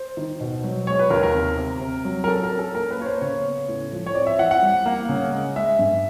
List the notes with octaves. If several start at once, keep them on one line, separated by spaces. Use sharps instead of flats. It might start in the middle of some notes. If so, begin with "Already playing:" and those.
Already playing: C5
D#3
B2
F#3
G#3 C#5
B4
D#2 A#4
A#4
C3
C3
C3
F#3
A#4
C#4 A4
A#4
C#4
A4
A#3 A#4
B4
A#3 C#5
C5
C#3 C#5
B3
A2
F3
C#5
C4 D5
E5
E3 F#5
F#5
G3
A#3
C#3
G#3
G#3 E5
G2